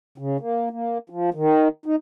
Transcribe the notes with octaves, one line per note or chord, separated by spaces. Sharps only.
C#3
A#3
A#3
F3
D#3
D#4